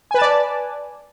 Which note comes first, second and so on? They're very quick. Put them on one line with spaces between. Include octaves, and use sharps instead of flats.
G#5 B4 A5 D5